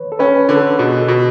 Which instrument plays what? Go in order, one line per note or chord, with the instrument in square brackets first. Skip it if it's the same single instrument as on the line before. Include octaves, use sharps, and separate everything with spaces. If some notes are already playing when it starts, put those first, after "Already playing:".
Already playing: [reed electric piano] B4 C#5
A4
[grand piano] C#4 [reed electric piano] B4
[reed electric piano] A4
B4
[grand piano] D3
[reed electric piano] A4
[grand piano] B2 [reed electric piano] G#4
[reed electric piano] A4
[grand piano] B2